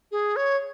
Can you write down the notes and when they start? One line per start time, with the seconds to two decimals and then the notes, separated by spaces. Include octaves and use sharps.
0.12 G#4
0.36 C#5